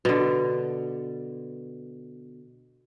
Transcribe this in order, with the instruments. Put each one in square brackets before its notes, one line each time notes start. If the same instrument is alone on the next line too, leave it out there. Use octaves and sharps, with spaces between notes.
[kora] B2 D3